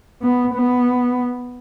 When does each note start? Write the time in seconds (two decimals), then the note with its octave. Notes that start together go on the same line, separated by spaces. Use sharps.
0.22 B3
0.55 B3